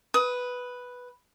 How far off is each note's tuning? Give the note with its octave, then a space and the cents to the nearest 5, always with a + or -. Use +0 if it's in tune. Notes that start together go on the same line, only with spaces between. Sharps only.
B4 +0 D#6 +25